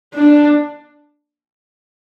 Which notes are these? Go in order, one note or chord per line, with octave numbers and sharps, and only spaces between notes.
D4